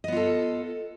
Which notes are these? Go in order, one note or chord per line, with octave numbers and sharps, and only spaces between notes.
B3 F4 A4 D#5